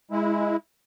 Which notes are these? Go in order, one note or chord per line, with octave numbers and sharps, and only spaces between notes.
G#3 E4